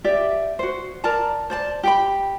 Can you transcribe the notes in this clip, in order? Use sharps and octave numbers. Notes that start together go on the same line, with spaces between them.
G4 D5 E5
F#4 C5
A#4 D5 A5 A#5
C5 D5 A5
G4 G5 B5